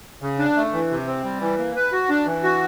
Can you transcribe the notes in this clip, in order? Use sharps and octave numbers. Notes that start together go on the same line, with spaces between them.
C#3
D4
A3
E3
C3
C4
G3
E3
A#3
B4
F#4
D4
E3
F#4